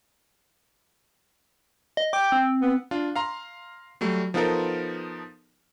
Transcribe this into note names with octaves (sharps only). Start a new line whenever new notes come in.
D#5
G5 D6
C4
B3
D4 F4
F5 A#5 C6
F#3 G3 A3
F3 B3 D#4 F4 A4 A#4